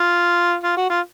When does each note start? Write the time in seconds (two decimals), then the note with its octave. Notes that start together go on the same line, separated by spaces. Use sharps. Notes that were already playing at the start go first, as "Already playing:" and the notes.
Already playing: F4
0.64 F4
0.77 F#4
0.90 F4